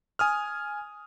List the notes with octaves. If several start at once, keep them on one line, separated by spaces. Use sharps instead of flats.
G#5 D#6 F6